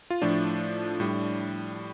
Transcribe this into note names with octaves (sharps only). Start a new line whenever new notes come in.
F4
A2 F3 A3 D4
A2 G3